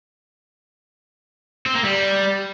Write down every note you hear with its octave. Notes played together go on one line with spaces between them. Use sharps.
C4
A#3
G3